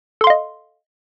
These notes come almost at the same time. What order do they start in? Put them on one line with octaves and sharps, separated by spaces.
A4 C6 F5 D#5